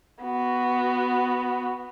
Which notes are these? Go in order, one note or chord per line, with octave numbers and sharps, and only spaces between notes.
B3 F#4